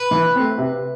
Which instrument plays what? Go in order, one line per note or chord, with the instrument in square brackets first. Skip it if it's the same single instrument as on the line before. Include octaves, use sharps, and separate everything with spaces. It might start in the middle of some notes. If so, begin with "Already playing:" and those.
Already playing: [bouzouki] B4
[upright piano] E3
A3 C4
C3